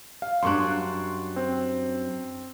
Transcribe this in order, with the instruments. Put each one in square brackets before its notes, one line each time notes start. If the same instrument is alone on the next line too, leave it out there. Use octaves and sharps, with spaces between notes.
[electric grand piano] F5
[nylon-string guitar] F#2 G3 D4 [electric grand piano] C6 C#6 F#6
[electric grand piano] C4